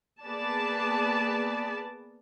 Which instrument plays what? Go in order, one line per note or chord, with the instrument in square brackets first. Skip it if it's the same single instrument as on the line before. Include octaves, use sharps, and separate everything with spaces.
[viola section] A#3 B3 G#4 B4 D5 A5